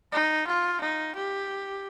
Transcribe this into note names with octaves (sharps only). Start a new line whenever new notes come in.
D#4
F4
D#4
G4